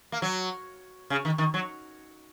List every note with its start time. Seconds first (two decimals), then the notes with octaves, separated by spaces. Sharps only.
0.12 A#3
0.22 F#3
1.10 C#3
1.25 D#3
1.38 D#3
1.54 F#3